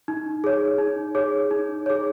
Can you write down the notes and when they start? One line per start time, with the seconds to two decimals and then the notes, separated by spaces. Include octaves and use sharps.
0.08 D#4
0.44 G#4 C#5
0.78 D#4
1.15 G#4 C#5
1.51 D#4
1.86 G#4 C#5